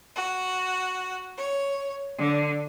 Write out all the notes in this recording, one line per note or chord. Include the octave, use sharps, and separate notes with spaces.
F#4
C#5
D3